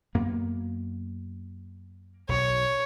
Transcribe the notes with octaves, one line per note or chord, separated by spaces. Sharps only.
F#2 A#3 B3
B1 B2 C#5